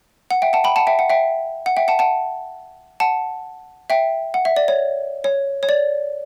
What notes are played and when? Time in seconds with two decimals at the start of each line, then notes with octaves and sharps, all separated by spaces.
0.31 F#5
0.42 E5 G5
0.53 F#5 A5
0.64 G5 B5
0.76 F#5 A5
0.87 E5 G5
0.99 F#5
1.10 E5 G5
1.66 F#5
1.77 E5 G5
1.88 F#5 A5
1.99 F#5 A5
3.00 F#5 A5
3.90 E5 G5
4.34 F#5
4.45 E5
4.56 D5
4.68 C#5
5.24 C#5
5.63 C#5
5.69 D5